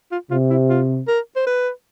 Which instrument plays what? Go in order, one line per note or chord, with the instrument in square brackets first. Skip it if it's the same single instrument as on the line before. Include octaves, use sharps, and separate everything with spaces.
[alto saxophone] F4
[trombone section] C3 [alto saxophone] F4
[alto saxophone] E4
F4
A#4
C5
B4